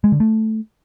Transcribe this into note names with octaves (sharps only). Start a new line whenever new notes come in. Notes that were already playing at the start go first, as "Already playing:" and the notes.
G#3
D3
A3